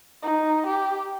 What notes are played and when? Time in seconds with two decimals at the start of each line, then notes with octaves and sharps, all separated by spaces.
0.23 D#4
0.67 G4